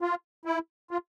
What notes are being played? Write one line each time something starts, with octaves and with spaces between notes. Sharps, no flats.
F4
E4
F4